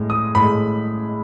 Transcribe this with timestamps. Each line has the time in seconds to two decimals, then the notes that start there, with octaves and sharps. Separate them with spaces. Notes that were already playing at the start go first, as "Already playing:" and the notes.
Already playing: A2 G#3
0.10 D#6
0.35 A2 G#3 B5